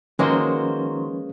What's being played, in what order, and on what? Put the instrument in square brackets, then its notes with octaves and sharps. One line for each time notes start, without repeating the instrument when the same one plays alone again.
[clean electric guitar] D#3 F#4 C5 [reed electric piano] F3 C#4 B4 [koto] G#3 A#3